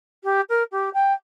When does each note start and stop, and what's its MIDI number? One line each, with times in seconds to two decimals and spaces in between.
0.24 0.41 67
0.49 0.63 70
0.71 0.89 67
0.94 1.13 79